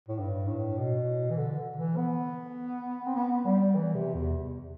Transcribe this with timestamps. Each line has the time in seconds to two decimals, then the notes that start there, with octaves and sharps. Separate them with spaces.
0.08 A2
0.19 G2
0.48 A2
0.78 B2
1.30 E3
1.37 D3
1.76 E3
1.97 B3
3.07 C4
3.16 B3
3.45 G3
3.75 E3
3.94 C3
4.14 E2